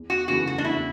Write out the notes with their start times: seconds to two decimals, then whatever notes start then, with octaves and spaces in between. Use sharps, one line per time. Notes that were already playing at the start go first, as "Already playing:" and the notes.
Already playing: E2
0.10 F#4
0.28 C#3 E3 A3 E4 F#4
0.47 F#4
0.58 D4
0.64 E2 E4